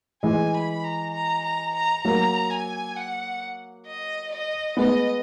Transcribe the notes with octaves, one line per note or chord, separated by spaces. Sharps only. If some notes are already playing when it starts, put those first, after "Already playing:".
E3 G#3 G#5
B5
A#5
A#5
A#5
A#5
F#3 A#3 A#5
G#5
F#5
D#5
D#5
G#3 B3 D#5